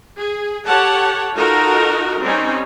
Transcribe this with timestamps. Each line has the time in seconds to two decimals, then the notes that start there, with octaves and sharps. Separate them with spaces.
0.18 G#4
0.66 G4 A4 C#5 F#5 A5
1.35 D#4 F4 F#4 A4 A#4 D#5
2.20 G3 C4 C#4 D#4